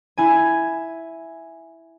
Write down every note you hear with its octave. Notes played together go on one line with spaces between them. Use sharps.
E4 G#5